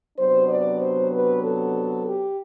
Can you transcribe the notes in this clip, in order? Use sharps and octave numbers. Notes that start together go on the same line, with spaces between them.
C3 F#3 B3 D4 C5
D5
C5
B4
A4
G4